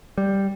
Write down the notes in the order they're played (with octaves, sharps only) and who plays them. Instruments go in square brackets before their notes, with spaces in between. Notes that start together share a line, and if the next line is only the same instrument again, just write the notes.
[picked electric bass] G3